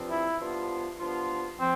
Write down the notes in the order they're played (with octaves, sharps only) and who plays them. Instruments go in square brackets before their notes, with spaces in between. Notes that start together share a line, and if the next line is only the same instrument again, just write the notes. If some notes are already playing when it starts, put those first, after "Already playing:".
Already playing: [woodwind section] G2 F3 C4 F4
[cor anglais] E4
[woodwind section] G2 F3 B3 D4 F4
G2 F3 B3 D4 F4
[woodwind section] F3 [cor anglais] C4